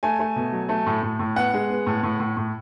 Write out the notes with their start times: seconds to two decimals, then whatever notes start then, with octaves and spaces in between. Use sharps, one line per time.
0.03 A3 G#5
0.19 A3
0.36 B2
0.52 F#3
0.69 A3
0.86 A2
1.03 A2
1.19 A2
1.36 B3 F#5
1.53 G#3
1.70 B3
1.87 A2
2.03 A2
2.20 A2
2.37 A2